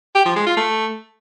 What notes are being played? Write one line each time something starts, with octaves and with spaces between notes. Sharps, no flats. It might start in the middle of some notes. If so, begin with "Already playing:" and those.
G4
F3
G#3
F4
A3